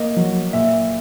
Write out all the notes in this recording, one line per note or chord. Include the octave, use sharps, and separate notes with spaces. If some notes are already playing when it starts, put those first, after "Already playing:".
Already playing: A#3 D#5
F#3
A#2 E5